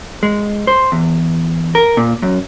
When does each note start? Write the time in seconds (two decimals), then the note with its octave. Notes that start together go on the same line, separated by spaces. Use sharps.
0.23 G#3
0.67 C5
0.92 E2
1.75 A#4
1.97 A#2
2.22 F#2